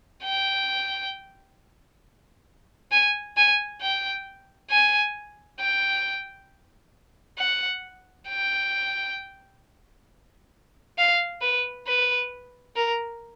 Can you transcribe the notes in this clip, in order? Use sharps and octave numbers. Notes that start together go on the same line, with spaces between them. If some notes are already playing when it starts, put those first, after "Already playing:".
G5
G#5
G#5
G5
G#5
G5
F#5
G5
F5
B4
B4
A#4